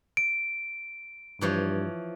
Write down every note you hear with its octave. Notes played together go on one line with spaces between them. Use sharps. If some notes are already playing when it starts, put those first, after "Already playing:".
D7
G2 E3 F3 C#5